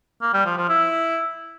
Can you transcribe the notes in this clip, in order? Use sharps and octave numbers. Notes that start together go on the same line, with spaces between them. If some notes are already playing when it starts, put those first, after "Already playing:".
A#3
G3
F3
F3
E4